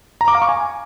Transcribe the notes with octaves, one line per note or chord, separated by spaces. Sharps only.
A#5
D6
F5
C#6
G#5